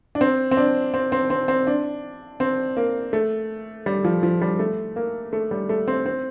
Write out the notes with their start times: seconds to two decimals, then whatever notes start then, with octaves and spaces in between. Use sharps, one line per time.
0.15 D4
0.21 C4
0.51 C4
0.57 D4
0.94 C4
1.12 C4
1.30 C4
1.48 C4
1.67 D4
2.40 C4
2.77 A#3
3.13 A3
3.86 G3
4.04 F3
4.23 F3
4.42 G3
4.59 A3
4.96 A#3
5.33 A3
5.51 G3
5.69 A3
5.88 C4
6.06 C4